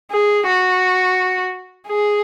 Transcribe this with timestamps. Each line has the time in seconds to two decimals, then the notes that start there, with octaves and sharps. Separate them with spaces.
0.11 G#4
0.47 F#4
1.88 G#4